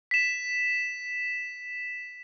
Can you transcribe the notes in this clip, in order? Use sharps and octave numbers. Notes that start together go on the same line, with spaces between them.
B6 E7